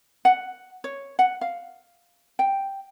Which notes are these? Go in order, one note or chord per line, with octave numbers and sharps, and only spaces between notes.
F#5
C#5
F#5
F5
G5